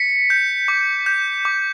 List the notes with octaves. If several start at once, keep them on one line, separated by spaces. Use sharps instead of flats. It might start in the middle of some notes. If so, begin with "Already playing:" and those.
Already playing: B6 C#7
G6
D6
G6
D6